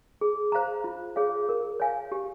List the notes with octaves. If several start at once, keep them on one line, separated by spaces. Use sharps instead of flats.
G#4
C5 F5 A#5
F4
G#4 C#5 F5
A#4
C#5 F5 G#5
G4